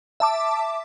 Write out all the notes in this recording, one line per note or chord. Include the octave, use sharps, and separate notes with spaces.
E5 A5 D6